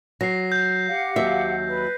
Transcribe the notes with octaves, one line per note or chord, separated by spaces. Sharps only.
F#3 A#6 C7
G6
G4 F5 F#5
D#2 F#3 E5
B4